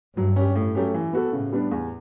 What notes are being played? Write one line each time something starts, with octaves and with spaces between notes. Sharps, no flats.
G2 F#3
C#4 G4
A2
F#3 A3 C#4 G4
E3
B3 F#4 A4
A2 C#3
G3 B3 D4
E2